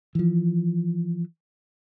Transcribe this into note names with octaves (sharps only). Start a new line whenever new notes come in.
E3 F3